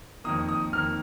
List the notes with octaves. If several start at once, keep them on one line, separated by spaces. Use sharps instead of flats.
F2 D#3 A#3 D#6
D#6
F2 D#3 A#3 F6